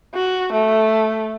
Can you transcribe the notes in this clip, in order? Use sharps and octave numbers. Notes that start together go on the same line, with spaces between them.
F#4
A3